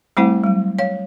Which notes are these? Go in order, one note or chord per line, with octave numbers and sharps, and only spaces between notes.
G3 A3 C4 E4 C5 F#5
F#3 G3
C#5 F5